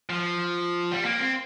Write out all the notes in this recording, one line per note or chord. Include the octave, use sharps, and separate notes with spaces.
F3
G3
A#3
C4